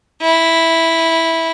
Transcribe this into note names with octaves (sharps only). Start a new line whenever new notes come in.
E4